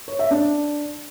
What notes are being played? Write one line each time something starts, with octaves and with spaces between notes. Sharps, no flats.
C#5
E5
D4